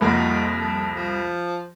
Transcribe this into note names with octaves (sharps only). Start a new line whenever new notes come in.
C2 F2 A#3 D#4 F4 F#4
A4
F3